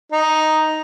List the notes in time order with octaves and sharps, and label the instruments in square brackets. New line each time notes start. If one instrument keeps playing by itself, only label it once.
[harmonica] D#4